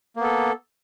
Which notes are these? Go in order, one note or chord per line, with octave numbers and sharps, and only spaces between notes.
A#3 B3 A4